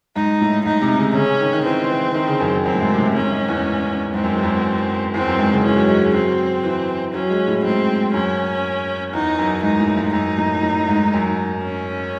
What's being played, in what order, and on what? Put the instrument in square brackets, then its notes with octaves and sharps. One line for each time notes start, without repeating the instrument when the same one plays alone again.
[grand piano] G#2 [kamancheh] D#4
[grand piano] A2
[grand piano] G#2 [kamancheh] D#4
[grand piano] C3
C#3
[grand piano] C#3 [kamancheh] C#4
[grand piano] D#3
D#3
[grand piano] E3 [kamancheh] C4
[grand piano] E3
D#3
C#3
F#2
[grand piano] F#2 [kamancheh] C4
[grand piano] A2
G#2
C3
A2
[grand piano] G#2 [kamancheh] C#4
[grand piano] G#2
E2
[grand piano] G#2 [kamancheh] C4
[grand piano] F#2
E2
F#2
[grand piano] E2 [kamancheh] C4
[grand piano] F#2
G#2
C#3
[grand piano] E3 [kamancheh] C#4
[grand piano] F#3
G#3
G#3
[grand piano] F#3 [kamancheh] C4
[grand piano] E3
[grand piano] F#3 [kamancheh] C#4
[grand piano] G#3
A2
[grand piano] G#2 [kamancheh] C4
[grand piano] F#2 [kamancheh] C#4
[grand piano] E2 [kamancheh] D#4
[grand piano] F#2
[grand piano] G#2 [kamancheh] D#4
[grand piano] A2
G#2
[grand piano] F#2 [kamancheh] D#4
[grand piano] A2
A2
G#2
F#2
[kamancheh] C#4